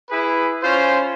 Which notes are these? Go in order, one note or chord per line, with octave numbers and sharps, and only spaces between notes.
E4 G#4 B4
C#4 F4 C5